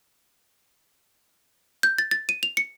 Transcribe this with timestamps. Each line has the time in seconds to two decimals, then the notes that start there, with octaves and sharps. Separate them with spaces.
1.83 G6
1.98 A6
2.11 A6
2.29 D#7
2.43 F7
2.57 C#7